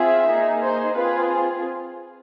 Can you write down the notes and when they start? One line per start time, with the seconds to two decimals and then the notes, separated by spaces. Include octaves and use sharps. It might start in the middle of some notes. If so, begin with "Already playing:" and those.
Already playing: C4 F4 G#4 E5
0.28 A#3 D#4 G#4
0.61 C5
0.95 C4 F4 G#4 B4